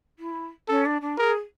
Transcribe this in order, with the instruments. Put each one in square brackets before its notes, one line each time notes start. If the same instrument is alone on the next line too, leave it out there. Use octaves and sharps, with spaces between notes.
[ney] E4
[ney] C#4 [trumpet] A4
[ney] D4
D4
[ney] G#4 [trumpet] A#4